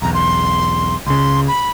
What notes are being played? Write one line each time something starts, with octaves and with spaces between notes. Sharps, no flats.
B1 E2 A#5
C6
C#2 C#3 C6
B5